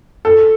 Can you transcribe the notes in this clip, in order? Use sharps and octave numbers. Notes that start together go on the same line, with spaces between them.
A4